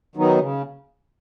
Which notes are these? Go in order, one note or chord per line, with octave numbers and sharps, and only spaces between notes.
D#3 F#3 B3 D#4
C#3